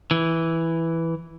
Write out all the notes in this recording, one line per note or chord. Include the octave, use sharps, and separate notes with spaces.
E3